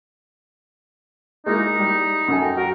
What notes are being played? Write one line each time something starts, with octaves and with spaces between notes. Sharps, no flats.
G#3 A#3 D#4 E4
G3
F#2 A4 G#5
G5
F#4 A#4